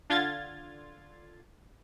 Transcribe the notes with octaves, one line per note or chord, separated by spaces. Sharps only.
D3 F4 G#6 A6